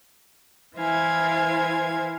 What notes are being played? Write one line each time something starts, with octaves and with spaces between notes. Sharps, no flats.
E3 E4 C5 F5 G#5 G#6